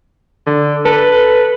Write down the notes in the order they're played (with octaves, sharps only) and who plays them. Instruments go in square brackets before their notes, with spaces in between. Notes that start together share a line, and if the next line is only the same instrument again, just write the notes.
[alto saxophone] D3
[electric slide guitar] A4 [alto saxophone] B4